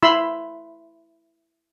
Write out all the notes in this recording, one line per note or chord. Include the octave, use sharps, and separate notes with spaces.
E4 B5 C6 E6